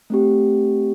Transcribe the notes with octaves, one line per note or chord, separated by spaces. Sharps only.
A3 C4 G4